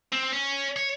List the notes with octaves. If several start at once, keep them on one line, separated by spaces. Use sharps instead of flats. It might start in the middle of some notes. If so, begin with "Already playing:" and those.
C4
C#4
C#5